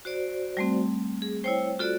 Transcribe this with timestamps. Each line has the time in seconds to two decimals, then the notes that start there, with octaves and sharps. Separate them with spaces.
0.05 F#4 C5 D5
0.57 G3 A3 C4
1.22 G#4
1.44 E4 C5 C#5 G5
1.79 F4 F#4 A4 D5 F#6